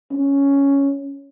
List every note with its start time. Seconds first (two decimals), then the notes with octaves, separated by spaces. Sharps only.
0.12 C#4